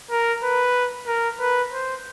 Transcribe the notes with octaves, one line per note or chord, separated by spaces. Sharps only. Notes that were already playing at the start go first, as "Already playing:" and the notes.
A#4
B4
A#4
B4
C5